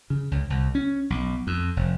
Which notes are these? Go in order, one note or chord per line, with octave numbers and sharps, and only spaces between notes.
C#3
C#2
C2
C#4
B1
F2
F1